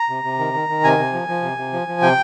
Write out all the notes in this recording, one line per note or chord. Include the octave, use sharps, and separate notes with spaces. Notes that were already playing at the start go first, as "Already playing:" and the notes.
Already playing: A#5
C3
C3
D#3
D#3
D#3
C3 G#5
C3
F3
F3
C3
C3
F3
F3
C3 G5